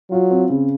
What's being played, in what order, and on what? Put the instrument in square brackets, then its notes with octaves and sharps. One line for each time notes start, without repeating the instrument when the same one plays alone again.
[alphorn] F#3 [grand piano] F4
[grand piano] C4
C#3